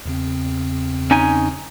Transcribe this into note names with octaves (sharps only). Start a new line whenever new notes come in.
E2 C#3 C4
C#4 D#4 G#5